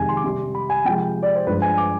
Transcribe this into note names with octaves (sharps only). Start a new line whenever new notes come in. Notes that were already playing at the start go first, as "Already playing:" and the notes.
Already playing: F2 C3 D#3 G#3 G#5
C6
D6
C3 G3 C6
B5
G#5
C3 F3 G#3 G5
D5
C5
G2 F3 G#3 B4
G#5
D6